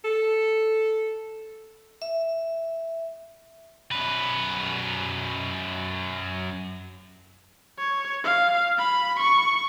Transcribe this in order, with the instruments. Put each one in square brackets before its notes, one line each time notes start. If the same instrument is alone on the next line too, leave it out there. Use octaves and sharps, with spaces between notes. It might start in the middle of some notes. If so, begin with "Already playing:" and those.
[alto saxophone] A4
[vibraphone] E5
[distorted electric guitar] F#2 B4
[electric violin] C#5
F5
B5
C#6